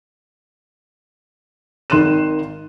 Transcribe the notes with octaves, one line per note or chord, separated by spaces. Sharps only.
G#1 D#3 C6 F#6 D#7 E7